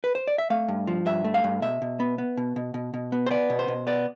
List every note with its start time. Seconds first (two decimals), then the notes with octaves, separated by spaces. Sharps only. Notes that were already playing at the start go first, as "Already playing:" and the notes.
0.04 B4
0.15 C5
0.27 D5
0.38 E5
0.50 A3 F5
0.68 G2
0.87 F3
1.06 G2 E5
1.24 A3
1.34 F5
1.44 G2
1.62 B2 E5
1.82 B2
2.00 B3
2.18 B3
2.37 B2
2.56 B2
2.74 B2
2.94 B2
3.12 B3
3.26 C5
3.31 B3 D5
3.50 B2
3.59 C5
3.68 B2
3.87 B3 D5